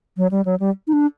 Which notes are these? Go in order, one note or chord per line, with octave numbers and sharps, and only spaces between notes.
F#3
G3
F#3
G3
D#4
D4